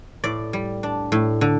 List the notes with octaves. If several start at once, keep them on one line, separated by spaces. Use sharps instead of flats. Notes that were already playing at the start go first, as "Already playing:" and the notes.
A2 D5
G3
D4
A2
D3